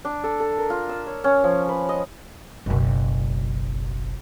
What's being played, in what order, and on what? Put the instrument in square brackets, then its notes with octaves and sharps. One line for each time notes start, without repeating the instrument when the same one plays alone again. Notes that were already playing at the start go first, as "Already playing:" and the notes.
[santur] D4
A4
A4
A#4
F4
E6
C#5
C#4
F3
B4
D#5
[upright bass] F#1 B1